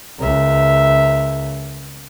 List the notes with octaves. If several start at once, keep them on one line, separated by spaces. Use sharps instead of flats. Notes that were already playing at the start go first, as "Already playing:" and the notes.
C#2 A#4 E5